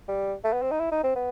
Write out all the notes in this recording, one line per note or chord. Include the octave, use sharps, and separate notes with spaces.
G3
A3
B3
C4
D#4
E4
D#4
C4
B3